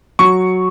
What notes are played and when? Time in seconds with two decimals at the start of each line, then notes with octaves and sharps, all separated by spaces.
0.19 F#3 C#6